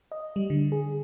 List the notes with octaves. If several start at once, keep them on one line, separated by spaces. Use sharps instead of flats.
D#5
G3
D3
G#4